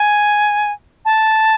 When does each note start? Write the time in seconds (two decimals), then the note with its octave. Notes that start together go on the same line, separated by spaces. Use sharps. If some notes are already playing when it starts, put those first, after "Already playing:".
Already playing: G#5
1.05 A5